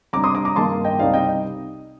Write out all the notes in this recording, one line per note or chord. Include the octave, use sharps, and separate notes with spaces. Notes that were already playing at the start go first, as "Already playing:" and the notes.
C3 G3 D4 A#5 D6
C6 D#6
A#5 D6
A#5 D6
G2 D#3 A#3 A5 C6
D#5 G5
C2 C3 G3 C4 D#4 D5 F5
D#5 G5